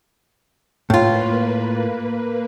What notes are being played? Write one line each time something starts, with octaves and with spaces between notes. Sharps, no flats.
A2 A#3 F4 B4